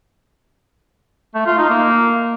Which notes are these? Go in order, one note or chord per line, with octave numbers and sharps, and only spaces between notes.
A3
F4
D#4
A#3